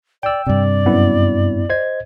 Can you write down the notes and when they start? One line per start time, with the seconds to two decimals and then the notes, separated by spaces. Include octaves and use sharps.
0.23 D5 G5 E6
0.47 G2 C3 D5
0.86 F#2 B3 E4
1.70 C5 D#5 G#6